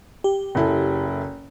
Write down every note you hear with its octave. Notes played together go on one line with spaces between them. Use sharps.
G4
F#1 E4 A4